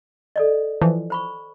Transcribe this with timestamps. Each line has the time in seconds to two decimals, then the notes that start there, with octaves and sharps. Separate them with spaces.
0.36 A4 D5 D#5
0.82 E3 F3
1.10 C5 B5 C#6